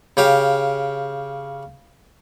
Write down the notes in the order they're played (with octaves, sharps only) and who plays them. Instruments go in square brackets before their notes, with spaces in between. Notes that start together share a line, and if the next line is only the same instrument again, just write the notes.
[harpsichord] C#3 G4 F5